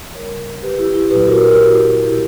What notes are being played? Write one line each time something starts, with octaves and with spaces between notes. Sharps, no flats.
C#3 G3 A#4 C#5
G4 B4
E4 G4
E4 G4
A#2 F#3 G4 B4
F#4 A#4
A#4
G4
F#4
E4 G4
B2 G3 E4 G4